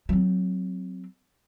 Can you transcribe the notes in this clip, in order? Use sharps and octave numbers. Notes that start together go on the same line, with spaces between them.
F#3 C4